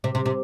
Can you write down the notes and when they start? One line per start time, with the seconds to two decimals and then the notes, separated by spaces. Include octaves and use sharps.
0.04 C3
0.15 C3
0.26 C3